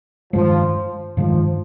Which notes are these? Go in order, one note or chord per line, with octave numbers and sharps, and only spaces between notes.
G2 D#3 F3 G#3
G2 D#3 F3 G#3